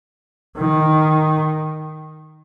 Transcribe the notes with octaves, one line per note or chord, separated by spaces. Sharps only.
D#3